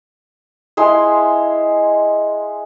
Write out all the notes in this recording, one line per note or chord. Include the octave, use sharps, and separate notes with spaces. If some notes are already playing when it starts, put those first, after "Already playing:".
G#3 E4 C6